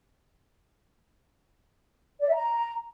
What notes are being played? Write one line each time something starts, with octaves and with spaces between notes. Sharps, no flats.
D5
E5
A#5